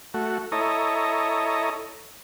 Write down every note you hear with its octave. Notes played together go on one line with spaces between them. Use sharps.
A3 F#4
E4 A4 C#5 D#5 A#5